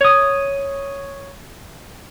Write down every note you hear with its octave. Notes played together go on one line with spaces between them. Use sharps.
C#5 D#6